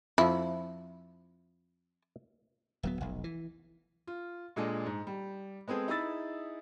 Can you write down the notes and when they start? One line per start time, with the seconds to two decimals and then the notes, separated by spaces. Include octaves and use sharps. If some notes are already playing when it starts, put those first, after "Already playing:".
0.18 F2 F3 E4
2.83 D1 F#3 B3
3.01 F1 B1
3.24 E3
4.07 F4
4.56 A#2 G#3 D4 A4 D#5
4.86 G#2
5.07 G3
5.68 G#3 B3 C4 G#4 A4
5.88 D#4 E4 G#4 B5 E6 A6